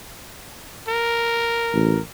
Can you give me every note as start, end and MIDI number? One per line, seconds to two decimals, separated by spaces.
0.89 2.01 70
1.73 1.99 33